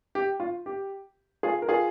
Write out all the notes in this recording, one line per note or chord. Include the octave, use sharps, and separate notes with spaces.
G4
F4
G4
F4 G#4
A#4
F4 G#4